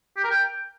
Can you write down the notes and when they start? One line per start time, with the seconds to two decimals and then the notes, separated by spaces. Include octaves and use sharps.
0.17 G4
0.24 A#4
0.31 G5